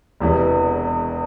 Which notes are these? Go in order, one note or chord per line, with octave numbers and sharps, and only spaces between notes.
E1 E2 C3 E3 B3